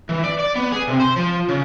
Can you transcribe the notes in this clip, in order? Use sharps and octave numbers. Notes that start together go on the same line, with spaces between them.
E3
D5
D5
B3
G#4
C3
C5
F3
C#3